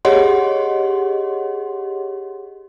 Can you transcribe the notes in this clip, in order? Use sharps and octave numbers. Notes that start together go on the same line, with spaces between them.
G4 G#4 C#5 D#5 F#5 C6